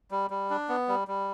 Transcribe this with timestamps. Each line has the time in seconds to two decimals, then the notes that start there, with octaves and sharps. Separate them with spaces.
0.11 G3
0.30 G3
0.50 D4
0.69 B3
0.88 G3
1.08 G3